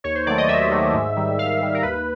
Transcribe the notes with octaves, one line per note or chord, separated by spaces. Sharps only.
D#2 C#5
C5
D#3 F#3 A3 D5
D#5
D#2 E5
D#3 F#3 A3
G#2
D#3 G3
G#2 F5
D#3 G3
A#4
D#2 B4